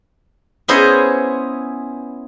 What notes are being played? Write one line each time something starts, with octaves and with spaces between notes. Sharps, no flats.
B3 C#4 E4 G#4 C5 D#5